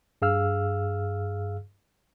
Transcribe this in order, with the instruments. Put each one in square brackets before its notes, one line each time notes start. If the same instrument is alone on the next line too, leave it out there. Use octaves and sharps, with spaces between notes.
[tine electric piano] G2 G#4 F5 E6 F6